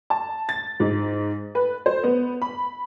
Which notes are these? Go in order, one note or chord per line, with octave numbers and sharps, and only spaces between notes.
A5
A6
G#2
B4
C5
B3
B5